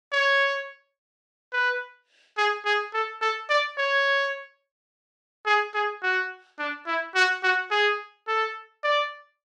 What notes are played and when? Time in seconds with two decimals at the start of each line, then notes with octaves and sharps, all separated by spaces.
0.13 C#5
1.53 B4
2.38 G#4
2.65 G#4
2.94 A4
3.21 A4
3.50 D5
3.78 C#5
5.46 G#4
5.75 G#4
6.03 F#4
6.59 D4
6.87 E4
7.15 F#4
7.43 F#4
7.71 G#4
8.28 A4
8.84 D5